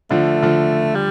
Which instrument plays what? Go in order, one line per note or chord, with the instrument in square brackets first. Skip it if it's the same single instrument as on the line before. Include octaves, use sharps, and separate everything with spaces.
[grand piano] D3 F3 [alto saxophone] A3
[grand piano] D3 F3
[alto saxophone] G3